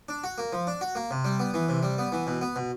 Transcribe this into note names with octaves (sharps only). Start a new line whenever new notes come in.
D4
F#4
A#3
F3
D4
F#4
A#3
C3
G3
B3
E3
C3
G3
B3
E3
B2
B3
B2